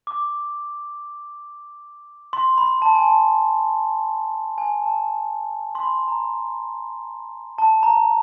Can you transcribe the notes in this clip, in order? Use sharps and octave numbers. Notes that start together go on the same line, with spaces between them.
D6
C6
B5
A5
G#5
A5
G#5
A5
C6
B5
A#5
A5
A#5